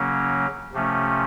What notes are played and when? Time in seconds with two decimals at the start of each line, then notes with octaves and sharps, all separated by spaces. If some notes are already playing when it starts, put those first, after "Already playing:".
Already playing: C#3 F#3 A#3 C#4
0.73 C3 F3 A3 C#4